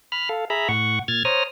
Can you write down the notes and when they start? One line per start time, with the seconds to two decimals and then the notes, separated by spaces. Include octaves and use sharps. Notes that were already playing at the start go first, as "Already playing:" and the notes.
0.12 B5 F6
0.29 A4 F5
0.50 G#4 E5 A#5 B5
0.69 A2 F#5 C#6
1.08 A#2 F6 G#6 A6
1.25 C5 C#5 A#5 D#6 F6